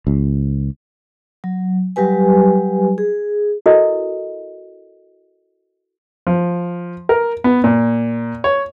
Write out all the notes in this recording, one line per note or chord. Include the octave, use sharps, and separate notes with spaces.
C#2
F#3
F#3 G3 G4 B4 G#5
G#4
E4 F#4 A4 A#4 D#5
F3
A#4
B3
A#2
C#5